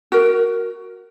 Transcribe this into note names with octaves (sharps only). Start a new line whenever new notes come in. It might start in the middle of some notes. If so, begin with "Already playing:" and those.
F#4 A#4